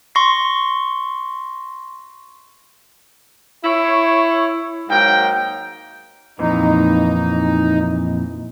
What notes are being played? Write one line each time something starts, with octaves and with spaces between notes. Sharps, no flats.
C6 C#6 A#6 C7
E4 C#5
G#2 F#3 A#3 G5
F2 A#2 E3 D#4